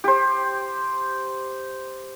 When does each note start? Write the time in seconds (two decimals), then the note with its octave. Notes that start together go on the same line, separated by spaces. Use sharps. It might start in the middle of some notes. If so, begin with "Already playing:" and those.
0.04 G4 C5